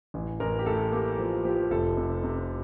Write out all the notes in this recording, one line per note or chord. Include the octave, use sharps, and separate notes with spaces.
A1
A1 A#4
G4
A2 A4
A#3 G4
F3
F3 G4
F1 A4
C3
C3